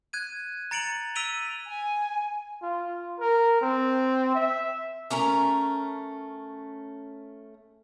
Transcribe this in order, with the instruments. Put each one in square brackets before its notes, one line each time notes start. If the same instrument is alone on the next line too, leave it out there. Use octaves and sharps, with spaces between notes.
[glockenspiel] F#6 G#6 D#7
A#5 A6 C#7 D7 F7 F#7
E6 B6 D7 D#7 F7 G7
[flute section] G#5
[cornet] F4
A#4
C4
E5
[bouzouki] A3 C#4 A#4 A#5